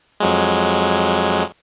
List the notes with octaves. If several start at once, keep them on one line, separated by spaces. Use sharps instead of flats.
F2 F#3 G#3